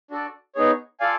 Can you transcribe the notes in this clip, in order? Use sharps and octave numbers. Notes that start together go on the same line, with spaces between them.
D4 F#4 A4 D5
B3 D#4 G#4 C#5
F4 A4 D5 F5 G#5